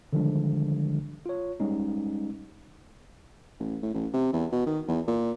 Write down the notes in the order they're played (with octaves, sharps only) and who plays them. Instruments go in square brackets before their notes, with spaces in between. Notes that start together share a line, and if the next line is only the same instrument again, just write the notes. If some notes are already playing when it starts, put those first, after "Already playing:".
[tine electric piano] D3 D#3 F3 G3 G#3 D4
F4 C#5
G3 G#3 C#4 D#4
[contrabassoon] A1
A2
A1
C3
E2
B2
D#3
E2
A#2